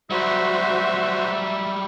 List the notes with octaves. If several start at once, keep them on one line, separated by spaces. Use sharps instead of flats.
F#3 G3 F#4 C5 E5